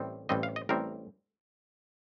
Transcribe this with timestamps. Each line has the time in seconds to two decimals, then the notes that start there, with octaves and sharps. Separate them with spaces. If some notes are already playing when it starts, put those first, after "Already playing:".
Already playing: A1 A2 G3 C4
0.29 A1 A2 G3 C4 D#5
0.43 F5
0.56 D#5
0.69 A1 A2 G3 C4 A#4